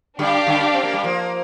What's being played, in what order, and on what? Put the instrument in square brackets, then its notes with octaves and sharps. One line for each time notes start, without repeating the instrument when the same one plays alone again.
[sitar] D3 G3 [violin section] D4 G4 D5 F5
[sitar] D3 G3
C4
A#3
G3
F3 A#3